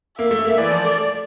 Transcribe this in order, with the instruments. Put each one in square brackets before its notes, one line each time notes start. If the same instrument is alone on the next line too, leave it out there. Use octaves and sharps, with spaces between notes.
[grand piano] A#3 [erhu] E5
[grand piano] A3
A#3
[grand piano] E3 [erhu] D5
[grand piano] F3
A3